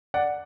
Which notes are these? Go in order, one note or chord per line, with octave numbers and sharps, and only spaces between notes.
D5 F#5